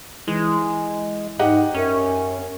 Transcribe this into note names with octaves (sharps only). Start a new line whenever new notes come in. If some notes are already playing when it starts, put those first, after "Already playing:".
E3 G#3
G#2 G4 D#5 F#5
F#2 C#4